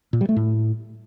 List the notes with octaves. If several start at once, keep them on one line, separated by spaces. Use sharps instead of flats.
A#2
G3
A3
A2